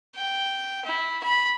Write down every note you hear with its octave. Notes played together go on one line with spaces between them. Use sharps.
G5
E4
B5